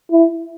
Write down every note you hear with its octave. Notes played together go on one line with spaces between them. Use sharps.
E4